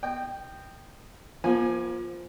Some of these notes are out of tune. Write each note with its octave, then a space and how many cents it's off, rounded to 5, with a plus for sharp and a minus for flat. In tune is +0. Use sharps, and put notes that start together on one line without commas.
D#5 -25 G5 +0
F3 +0 A#3 +40 G#5 +0